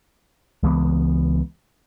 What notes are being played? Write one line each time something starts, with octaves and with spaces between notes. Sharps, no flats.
C#2 E3 G#3 B3